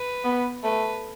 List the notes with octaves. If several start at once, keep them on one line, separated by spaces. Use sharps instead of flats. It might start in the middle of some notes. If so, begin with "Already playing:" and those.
Already playing: B4
B3
A3 B4